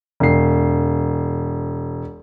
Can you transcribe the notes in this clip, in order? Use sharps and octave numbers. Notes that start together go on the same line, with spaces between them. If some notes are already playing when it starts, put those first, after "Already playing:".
E1 C7